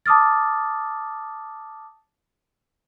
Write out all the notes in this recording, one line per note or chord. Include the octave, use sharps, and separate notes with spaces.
A5 D6 D#6 F6 A6